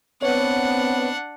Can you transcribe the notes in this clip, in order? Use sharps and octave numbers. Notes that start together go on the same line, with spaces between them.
B3 C4 D4 C#5 F#5